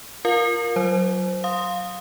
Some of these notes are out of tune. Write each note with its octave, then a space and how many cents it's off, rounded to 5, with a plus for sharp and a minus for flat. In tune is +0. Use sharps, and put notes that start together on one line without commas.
F4 +0 A#4 +10 F5 +25
F#3 +0 C5 +0
F5 +15 C6 +0 D#6 +0